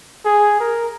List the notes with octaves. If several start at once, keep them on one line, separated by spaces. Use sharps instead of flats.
G#4
A#4